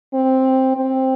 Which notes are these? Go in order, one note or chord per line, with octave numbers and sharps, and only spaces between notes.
C4
C4